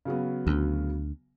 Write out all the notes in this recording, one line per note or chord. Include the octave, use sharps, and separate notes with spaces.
C#3 F#3 B3
D2